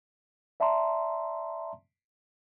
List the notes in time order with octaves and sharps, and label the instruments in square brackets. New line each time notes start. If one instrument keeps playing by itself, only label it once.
[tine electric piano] D5 E5 A5 A#5 C6